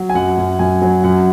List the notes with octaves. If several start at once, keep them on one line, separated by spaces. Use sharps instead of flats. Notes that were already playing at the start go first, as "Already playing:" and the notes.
Already playing: F#3
G#5
F#2 F#5
F#2
F#2 G#5
F#3
F#2 F#5